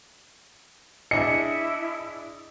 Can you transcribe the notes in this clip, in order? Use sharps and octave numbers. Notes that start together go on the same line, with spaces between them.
D4 E4 G#4 D#5 C#7